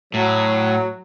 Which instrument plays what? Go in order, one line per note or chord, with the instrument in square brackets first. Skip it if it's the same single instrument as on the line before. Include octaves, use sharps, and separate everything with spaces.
[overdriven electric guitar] A2 [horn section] F#3